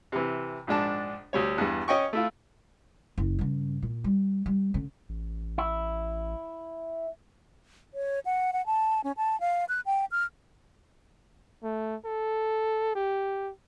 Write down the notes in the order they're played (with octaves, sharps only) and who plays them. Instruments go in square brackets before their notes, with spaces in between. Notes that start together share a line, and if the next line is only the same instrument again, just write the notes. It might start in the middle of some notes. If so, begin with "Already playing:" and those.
[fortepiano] C3 E3
A#1 G#2 D4 A5
D2 G3 C#5
E2 G2
C#4 D#5 G5 C#6
A3 E4 F4
[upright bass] F#1
G2 C#3
A#2
G3
G3
D3 C#4
[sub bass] A1
[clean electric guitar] E4
[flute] C#5
F#5
F#5
A5
C#4
A5
F5
F#6
G5
F6
[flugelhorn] A3
A4
G4